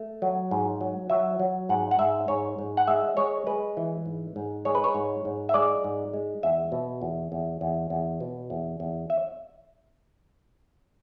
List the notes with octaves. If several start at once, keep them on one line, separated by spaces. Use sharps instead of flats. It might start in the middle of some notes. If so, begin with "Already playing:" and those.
Already playing: A3
F#3
G#2
F#3
F#3 E5
F#3
G#2 F#5
F#5
G#2 E5
G#2 C#5
G#2
F#5
G#3 E5
G#3 C#5
G#3 B4
E3
G#2
G#2
G#3 C#5
B4
C#5
G#2
G#2
E5
G#3 D5
G#2
G#3
E2 E5
B2
E2
E2
E2
E2
B2
E2
E2
E5